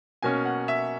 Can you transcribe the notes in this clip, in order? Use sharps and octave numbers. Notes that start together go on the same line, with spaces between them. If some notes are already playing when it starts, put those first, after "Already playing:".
B2 A#3 C#4 G#5
F#5
E5